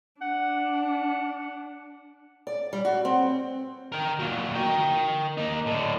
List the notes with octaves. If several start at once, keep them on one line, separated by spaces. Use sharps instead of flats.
D4 F#5
D5
G3
F#4
C4
A#4 G5
A#2 F#3
A#4 G5
A#3 D#4
A2 D3